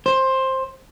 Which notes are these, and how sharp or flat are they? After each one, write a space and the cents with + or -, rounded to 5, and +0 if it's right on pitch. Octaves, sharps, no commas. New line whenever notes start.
C5 +15